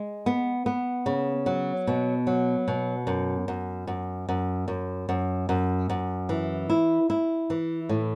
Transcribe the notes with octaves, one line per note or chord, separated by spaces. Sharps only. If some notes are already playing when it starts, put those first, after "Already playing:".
Already playing: G#3
B3
B3
C#3
F#3
B2
F#3
B2
F#2
F#2
F#2
F#2
F#2
F#2
F#2
F#2
E3
E4
E4
E3
A2